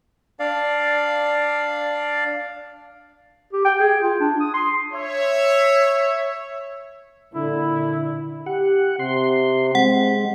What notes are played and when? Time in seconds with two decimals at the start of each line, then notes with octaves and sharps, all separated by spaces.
0.40 D4 D5 F5
3.53 G4
3.65 G5
3.80 G#4
4.01 F4
4.20 D4
4.40 D#6
4.54 C6
4.93 C#5 E5
7.35 A#2 D3 E4
8.46 G4 F#5
8.99 C3 C6
9.75 G#3 C4 F#5